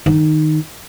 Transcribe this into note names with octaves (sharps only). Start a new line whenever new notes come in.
D#3 D#4